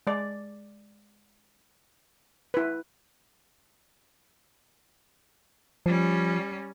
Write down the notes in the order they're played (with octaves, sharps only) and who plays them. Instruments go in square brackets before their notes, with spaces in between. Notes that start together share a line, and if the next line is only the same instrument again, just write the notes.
[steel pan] G#3 D5
E4 B4
[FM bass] F3 [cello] G3 C#4